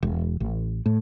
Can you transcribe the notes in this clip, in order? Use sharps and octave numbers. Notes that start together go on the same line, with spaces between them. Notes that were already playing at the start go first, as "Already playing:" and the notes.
E1
A1
A2